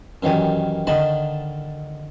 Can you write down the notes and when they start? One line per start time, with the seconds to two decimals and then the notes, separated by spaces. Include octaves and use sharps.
0.23 F#2 D#3 E3 G3 G#5
0.87 D3 D#3 D#5 A5 B5